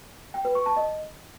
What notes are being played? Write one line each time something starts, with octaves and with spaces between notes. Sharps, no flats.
G5
B4
C#6
A5
D#5